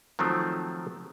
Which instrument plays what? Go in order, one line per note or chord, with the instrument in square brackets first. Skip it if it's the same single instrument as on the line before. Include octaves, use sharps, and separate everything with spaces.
[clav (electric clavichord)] D#3 F3 F#3 A3 C4